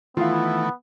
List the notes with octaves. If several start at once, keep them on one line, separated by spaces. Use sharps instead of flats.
D#3 E3 A3 B3 E4 F4 F5